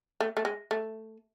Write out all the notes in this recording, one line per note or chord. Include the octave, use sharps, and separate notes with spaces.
A3
A3
G#3
A3